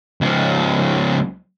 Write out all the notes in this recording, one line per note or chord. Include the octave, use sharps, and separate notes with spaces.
C#2 F3